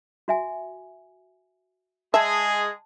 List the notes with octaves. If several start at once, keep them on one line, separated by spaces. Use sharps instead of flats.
F#4 E5 G#5
G#3 G#4 E5 A5